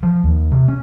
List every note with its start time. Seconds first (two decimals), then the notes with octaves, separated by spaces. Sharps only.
0.03 F3
0.24 D#2
0.51 C3
0.68 C#4